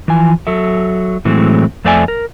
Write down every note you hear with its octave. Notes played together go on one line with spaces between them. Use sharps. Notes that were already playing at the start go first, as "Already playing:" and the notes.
E3 F3 G#5
F#3 A4 E5
A2 E3 F#3 G#3 A3 C4
F2 A3 C5 D5 E5 G#5
A#4